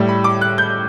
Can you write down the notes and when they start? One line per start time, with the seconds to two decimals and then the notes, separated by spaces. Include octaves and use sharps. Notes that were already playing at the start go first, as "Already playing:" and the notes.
Already playing: A2 G3
0.09 B5
0.24 D6
0.41 F#6
0.58 G6